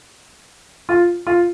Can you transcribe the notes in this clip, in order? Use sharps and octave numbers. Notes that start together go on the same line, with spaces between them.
F4
F4